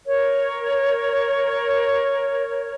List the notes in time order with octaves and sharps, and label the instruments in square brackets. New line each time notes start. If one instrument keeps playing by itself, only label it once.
[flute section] A#4 C#5